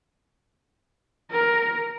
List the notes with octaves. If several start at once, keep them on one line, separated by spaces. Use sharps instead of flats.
A#4